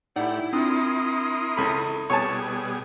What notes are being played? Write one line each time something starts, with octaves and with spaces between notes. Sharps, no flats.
A2 D#4 E4 G4 D5 F#5
C4 D4 F4 A#4 C6 D#6
C#2 A4 B5
B2 G3 G#4 C#5 G#5 A5